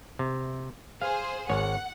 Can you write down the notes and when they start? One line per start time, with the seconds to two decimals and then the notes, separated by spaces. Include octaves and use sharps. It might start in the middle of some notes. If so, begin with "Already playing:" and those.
0.19 C3
1.02 G#4 C5 F5
1.50 G#1 C#5 F#5